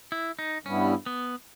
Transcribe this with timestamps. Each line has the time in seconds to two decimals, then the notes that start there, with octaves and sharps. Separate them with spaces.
0.12 E4
0.39 D#4
0.65 G2 G3 B3 C#4 E4
1.06 B3